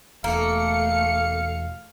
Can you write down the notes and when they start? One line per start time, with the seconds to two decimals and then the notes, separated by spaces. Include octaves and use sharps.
0.24 E1 A3 A#3 F5 C#7